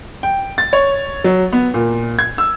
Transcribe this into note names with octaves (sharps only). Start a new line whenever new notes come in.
G5
A6
C#5
F#3
B3
A#2
G#6
E6